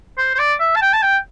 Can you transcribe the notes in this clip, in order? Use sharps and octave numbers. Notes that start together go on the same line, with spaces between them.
C5
C5
D5
E5
A5
G5
A5
G5